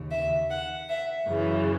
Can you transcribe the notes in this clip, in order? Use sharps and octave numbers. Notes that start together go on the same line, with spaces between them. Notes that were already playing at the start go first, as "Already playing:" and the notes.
Already playing: D#2 C#3
E5
F#5
E5
F#2 C#3 E3